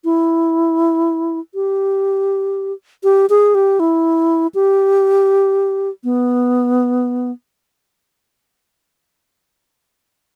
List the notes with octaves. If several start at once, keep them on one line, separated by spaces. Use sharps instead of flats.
E4
G4
G4
G#4
G4
E4
G4
B3